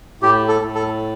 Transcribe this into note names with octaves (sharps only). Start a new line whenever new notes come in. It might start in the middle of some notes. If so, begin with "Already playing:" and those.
A2 G4
A4
A2
A4